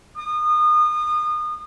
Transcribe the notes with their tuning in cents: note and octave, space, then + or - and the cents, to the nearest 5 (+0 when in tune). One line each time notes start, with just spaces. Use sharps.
D#6 -30